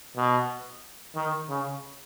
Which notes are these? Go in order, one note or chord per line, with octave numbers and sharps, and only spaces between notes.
B2
D#3
C#3